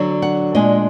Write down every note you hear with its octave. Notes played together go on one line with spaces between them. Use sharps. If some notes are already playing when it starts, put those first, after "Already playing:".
Already playing: D3 F#3 D4
F#5
A#2 G#3 D4 D#5